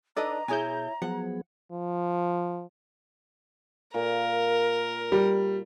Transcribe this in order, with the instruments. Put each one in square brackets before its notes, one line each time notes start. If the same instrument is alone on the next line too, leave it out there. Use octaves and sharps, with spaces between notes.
[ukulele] D4 B4 D#5 [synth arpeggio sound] D#4 A4 D5 [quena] A#5
[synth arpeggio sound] B2 G#4 G6 [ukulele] E4 C#5 G#5
[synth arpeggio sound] F3 [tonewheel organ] F#3 B3 G#4 [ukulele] F#5
[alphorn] F3
[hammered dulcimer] A#2 [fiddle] A#4
[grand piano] G3